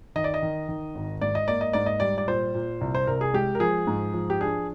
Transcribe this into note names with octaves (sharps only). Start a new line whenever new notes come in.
D#3 D#5
D5
D#5
D#3
D#3
G#1
G#2 D5
D#5
A#3 D5
D#5
G#2 D5
D#5
G3 D5
D5
A#2 C5
A#2
C2
C5
C2 A#4
G#4
G#3 G4
A#4
F3 G#4
G#2
F3
G4
D4 G#4